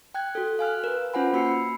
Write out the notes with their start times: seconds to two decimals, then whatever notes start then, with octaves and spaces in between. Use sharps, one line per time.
0.14 G5 F#6 G#6
0.35 F#4 A4
0.59 F5 G#5 F6 F#6
0.84 A#4 B4
1.14 C#4 F4 C5 F#5 G#5 B5
1.33 A#3 F#4 B5 E6 C7 C#7